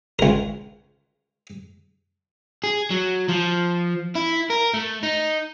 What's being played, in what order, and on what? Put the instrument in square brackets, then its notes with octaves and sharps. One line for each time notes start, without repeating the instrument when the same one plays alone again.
[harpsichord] C#2 A#4
[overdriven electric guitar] G#4
F#3
F3
E4
A#4
A3
D#4